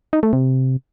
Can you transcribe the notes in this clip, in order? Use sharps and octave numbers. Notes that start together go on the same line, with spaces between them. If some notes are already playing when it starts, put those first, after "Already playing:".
D#4
A3
C3